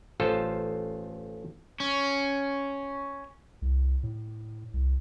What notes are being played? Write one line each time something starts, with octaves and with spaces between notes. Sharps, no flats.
A1 F4 A4 C5
C#4
C2
A2
C2